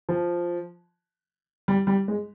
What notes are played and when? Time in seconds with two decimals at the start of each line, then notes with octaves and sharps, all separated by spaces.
0.09 F3
1.68 G3
1.87 G3
2.08 G#3